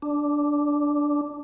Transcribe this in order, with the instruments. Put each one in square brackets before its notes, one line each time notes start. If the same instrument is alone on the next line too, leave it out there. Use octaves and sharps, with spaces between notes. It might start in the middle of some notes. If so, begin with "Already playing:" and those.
[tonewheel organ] D4